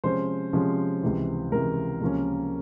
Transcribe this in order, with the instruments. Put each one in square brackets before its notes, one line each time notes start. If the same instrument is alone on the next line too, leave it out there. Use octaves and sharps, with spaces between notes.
[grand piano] C3 F3 G#3 C#4 C5
C3 F3 G#3 C#4
C#2 C3 E3
C#2 C3 E3 A#4
C#2 C3 F3 A#3 C#4